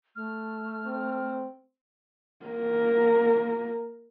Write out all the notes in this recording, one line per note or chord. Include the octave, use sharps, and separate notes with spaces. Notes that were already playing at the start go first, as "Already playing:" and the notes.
A3 F6
C4
A#3 A#4